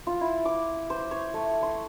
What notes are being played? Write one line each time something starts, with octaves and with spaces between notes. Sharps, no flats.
F4
E4
D6
C5
C#5
A3
C6